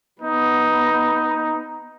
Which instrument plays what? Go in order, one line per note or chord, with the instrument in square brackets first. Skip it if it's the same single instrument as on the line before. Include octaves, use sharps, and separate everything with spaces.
[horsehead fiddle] B3 [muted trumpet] D#4